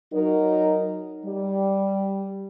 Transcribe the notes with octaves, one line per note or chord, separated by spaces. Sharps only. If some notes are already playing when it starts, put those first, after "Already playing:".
F#3 D#4 A#4
G3